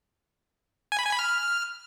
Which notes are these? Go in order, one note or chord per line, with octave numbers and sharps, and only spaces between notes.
G#5
B5
G#5
B5
F6